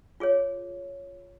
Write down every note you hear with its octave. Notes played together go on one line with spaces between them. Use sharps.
F4 G#4 C#5